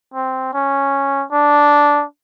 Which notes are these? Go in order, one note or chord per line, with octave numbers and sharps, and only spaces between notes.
C4
C#4
D4